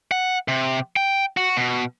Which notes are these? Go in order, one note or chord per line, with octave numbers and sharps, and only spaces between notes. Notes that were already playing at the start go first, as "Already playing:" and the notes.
F#5
C3
G5
F#4
B2